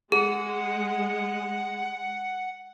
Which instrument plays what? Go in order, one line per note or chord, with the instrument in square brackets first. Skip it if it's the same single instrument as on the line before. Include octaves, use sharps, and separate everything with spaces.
[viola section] G#3 [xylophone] G#4 [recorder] F#5